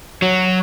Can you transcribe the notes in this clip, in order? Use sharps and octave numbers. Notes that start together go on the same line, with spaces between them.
F#3